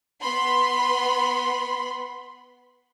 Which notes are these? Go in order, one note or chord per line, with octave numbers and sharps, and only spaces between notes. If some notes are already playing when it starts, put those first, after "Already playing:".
B3 B5 C6